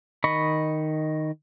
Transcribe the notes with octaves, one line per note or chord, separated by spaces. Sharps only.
D#3 D#5 B5 C#6